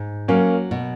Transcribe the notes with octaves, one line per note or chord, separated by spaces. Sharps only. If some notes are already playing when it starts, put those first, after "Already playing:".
Already playing: G#2
F#3 A#3 C#4
B2